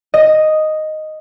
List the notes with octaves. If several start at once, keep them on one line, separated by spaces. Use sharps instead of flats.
D#5